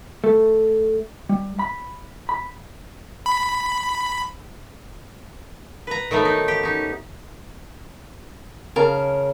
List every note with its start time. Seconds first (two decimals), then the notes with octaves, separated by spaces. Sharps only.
0.24 A3
1.29 G3
1.59 B5
2.29 B5
3.26 B5
5.87 B4 A#5
6.11 D#3 F#3 A3 B3
6.25 D#4
6.48 G4
6.63 C#4 D#4
8.76 C#3 A#4 A5